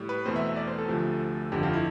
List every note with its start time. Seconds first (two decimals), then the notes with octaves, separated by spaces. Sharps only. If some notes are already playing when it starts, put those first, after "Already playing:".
Already playing: A2 G3
0.09 B4
0.25 E2 B2 A3 C4 C5
0.36 E5
0.46 E5
0.56 D5
0.67 C5
0.78 A4
0.89 D2 C3 F3 A3
1.52 G1 F2 D3 G4
1.63 F4
1.73 E4